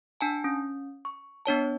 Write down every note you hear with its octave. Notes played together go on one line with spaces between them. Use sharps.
D4 G#5 A5
C#4
C#6
B3 D4 C#5 A5